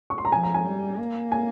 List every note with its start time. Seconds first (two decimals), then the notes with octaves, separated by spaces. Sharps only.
0.10 C#6
0.18 C6
0.25 A#5
0.32 F3 G#5
0.43 A#5
0.54 G#5
0.65 G3
0.98 A#3
1.32 G#5